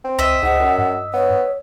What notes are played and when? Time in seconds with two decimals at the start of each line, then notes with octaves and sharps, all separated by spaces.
0.04 C4
0.19 C#2 D#5 E5
0.43 C#2 G#2 F#5
0.60 F#2
0.78 G2
1.14 B3 C#5